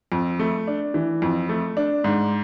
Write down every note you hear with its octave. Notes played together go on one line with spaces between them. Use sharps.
F2
A3
D4
E3
F2
A3
D4
G#2